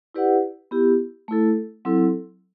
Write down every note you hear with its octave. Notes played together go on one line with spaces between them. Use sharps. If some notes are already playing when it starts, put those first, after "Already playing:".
E4 G4 B4 D5 F#5
B3 E4 G4
A3 E4 A4
F#3 C4 E4 A4